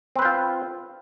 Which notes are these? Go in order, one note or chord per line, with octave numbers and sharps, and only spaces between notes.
C4 F4 B4 C5